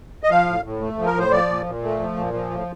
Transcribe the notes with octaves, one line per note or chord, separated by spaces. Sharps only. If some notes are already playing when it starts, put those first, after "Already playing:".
D#5
F3 F5
A2
A2
A3
F3
A#4
A2 C5
F3 D5
A#2
A#2
A3
F3
A#2
F3
A2